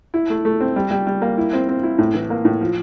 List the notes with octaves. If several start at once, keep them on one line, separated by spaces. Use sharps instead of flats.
E4
A3
A3
C4
G3
G3
G3
A#3
E4
C4
C4
E4
A2
E3
A#3
A2
F3